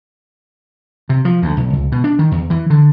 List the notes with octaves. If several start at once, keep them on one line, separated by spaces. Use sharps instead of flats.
C3
F3
D2
B1
C#2
B2
D4
D#3
E2
E3
D3